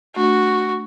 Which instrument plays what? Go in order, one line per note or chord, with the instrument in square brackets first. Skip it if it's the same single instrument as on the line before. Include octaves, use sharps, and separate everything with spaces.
[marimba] A3 D4 [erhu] F#4